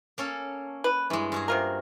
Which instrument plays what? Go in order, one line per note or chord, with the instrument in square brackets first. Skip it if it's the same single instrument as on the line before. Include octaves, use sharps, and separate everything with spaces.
[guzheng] A#3 C#4 A4
[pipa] B4
[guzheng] G2 G#3 [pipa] E3
[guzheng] G2 F#4 G#4
[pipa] C3 F4 A#4